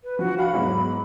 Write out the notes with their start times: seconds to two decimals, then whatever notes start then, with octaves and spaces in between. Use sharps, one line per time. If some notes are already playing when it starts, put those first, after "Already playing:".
0.04 B4
0.19 F3 F#4
0.39 F5 F#5 B5 C#6
0.54 E2 G#2 F#3